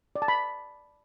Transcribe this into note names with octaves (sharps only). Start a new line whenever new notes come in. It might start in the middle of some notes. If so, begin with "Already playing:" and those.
D5
A5
B5